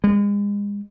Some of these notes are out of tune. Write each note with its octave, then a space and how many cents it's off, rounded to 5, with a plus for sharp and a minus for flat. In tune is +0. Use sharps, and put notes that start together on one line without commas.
G#3 -35